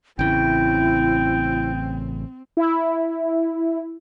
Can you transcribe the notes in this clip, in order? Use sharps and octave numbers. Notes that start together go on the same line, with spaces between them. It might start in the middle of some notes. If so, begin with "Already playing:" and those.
A1 C#3 C4 E4 G5
E4